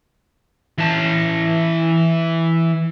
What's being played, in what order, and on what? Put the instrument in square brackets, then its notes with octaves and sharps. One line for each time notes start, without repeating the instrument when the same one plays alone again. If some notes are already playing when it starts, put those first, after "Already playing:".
[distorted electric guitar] E3 A5